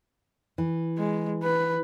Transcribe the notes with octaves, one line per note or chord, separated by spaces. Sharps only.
E3
G#3
B4